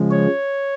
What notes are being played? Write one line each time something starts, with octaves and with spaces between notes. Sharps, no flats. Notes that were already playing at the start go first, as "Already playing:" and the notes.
Already playing: C#3 F3 G#3
C#5